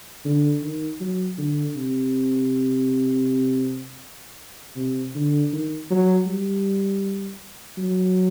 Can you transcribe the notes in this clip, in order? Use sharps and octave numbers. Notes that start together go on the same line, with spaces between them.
D3
D#3
F#3
D3
C3
C3
D3
D#3
F#3
G3
F#3